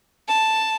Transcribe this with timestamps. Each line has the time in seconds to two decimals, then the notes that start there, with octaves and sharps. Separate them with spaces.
0.28 A5